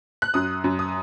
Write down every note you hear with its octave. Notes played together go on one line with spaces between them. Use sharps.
F#6
F#2 D#6
F#2
D#6